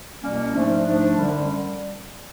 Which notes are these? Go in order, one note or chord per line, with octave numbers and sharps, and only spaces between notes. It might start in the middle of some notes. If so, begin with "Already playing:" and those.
C2 B2 G3 A#3 C#4
G#2 F3 A3 D4
G#2 F3 A3 D4
F#2 D3 G3